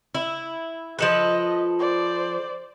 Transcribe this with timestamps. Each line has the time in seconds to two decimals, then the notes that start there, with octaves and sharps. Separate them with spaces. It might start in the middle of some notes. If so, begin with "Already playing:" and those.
0.15 E4
0.99 F3 A4 B4 D#5
1.79 C5 D5